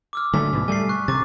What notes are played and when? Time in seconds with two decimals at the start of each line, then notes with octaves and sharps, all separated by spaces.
0.13 D6 E6 F6
0.33 D3 F#3 A3 G#5 B6
0.53 D2 G#2 B2
0.68 G3 A3 G#5 C7
0.89 C#6 F#6
1.08 C3 D6 A6